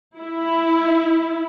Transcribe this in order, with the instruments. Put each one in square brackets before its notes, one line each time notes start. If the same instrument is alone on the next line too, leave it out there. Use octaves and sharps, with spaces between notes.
[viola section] E4